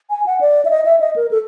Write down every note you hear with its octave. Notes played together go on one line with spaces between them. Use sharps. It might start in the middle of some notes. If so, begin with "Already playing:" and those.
G#5
F#5
D5
E5
D#5
E5
D#5
A#4
A4